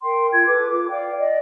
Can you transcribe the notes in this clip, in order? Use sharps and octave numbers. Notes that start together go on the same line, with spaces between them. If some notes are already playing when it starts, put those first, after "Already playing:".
A#4 G5 C6
F4 G#6
A4 B4 D6
F4 D6
D5 F5 G5
D5 D#5